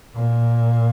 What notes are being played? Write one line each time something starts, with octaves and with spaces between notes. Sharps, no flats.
A#2